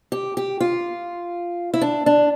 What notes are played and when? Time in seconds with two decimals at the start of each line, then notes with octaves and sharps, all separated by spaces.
0.12 G4
0.37 G4
0.60 F4
1.74 E4
1.81 D4
2.06 D4